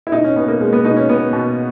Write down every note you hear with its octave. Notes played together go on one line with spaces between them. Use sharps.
E4
B2 D#4
C#4
B2 B3
A#3
B2 G#3
B3
B2 D#4
C#4
B2 B3
B2